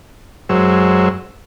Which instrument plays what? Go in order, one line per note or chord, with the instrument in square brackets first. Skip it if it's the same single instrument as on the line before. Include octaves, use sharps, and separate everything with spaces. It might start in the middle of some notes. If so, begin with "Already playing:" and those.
[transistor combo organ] F#2 F#3 G#3 C5 C#5 E6